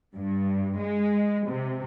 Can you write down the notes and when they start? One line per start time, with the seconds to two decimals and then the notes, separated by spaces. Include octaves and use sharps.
0.15 G2
0.77 G#3
1.47 C3